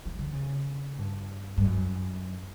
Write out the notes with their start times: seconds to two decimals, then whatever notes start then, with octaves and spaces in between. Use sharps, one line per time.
0.05 E3
0.19 D3
0.33 C#3
0.98 G2
1.57 G2
1.65 F#2